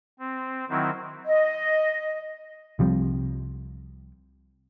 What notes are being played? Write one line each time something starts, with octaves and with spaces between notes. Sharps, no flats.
C4
D#3 F#3 C4 E4
D#5
C2 F3 G3 C4